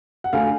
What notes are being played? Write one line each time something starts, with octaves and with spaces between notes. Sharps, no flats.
F#5
D2 F5 G#5